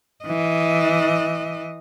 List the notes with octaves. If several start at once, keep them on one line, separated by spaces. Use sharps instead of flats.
E3 D#5